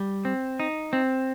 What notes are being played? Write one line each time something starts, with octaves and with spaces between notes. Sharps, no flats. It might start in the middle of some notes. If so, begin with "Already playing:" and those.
Already playing: G3
C4
D#4
C4